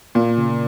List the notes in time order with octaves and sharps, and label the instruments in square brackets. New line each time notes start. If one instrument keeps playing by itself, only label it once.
[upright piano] A#2 [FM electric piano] F4
[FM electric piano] C#3